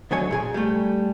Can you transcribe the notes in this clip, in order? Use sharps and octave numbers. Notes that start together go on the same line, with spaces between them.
D2 D3 F#3 G#3 C#5 G#5
A#2 G#4 G#5
G3 A3